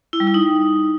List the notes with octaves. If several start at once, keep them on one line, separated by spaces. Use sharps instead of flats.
E4
G3
E4
D#4